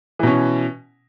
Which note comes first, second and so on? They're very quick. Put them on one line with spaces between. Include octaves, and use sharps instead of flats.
E3 B2 C#4